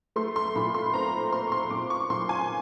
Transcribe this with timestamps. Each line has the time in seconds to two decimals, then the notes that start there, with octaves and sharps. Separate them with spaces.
0.16 A3 C6
0.36 C6
0.55 A#2 B5
0.74 C6
0.94 C4 A#5
1.32 C4 C6
1.47 C#6
1.52 C6
1.70 A#2 D6
1.90 C#6
2.10 A#2 C6
2.29 G#5